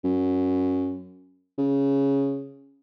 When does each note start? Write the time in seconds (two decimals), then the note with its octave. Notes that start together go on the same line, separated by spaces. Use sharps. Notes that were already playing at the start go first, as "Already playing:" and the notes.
0.05 F#2
1.58 C#3